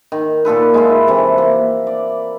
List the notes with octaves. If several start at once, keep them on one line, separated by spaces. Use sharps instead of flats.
D#3
A#2 F4 A4 B4
G#3 E4 F4
C3 E3 A4
A#3
D5